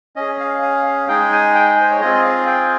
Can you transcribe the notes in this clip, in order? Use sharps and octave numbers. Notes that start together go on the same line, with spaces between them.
C#4 G#4 D#5
F5
F5
F5
G#3 D#4 G#4 G5
G#5
G5
C5
C#5
C4 F4 G#4 D#5
F5
G5